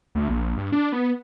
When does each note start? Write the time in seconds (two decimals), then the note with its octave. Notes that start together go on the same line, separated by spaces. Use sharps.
0.15 D2
0.28 A#1
0.57 G2
0.72 D4
0.92 B3